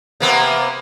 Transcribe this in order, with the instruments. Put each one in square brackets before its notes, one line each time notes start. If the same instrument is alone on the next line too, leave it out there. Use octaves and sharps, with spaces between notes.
[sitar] C3 A#3 B3